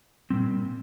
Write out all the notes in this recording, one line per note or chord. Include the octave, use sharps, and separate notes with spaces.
A#2 G3 C4